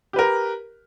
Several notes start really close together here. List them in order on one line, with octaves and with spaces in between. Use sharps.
G4 B4 A#4